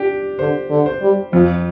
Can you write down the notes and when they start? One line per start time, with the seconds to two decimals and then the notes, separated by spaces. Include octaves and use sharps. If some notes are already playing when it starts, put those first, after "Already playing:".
Already playing: D4 G4
0.39 D3 C5
0.70 D3
0.86 C5
1.02 G3
1.33 F2 F3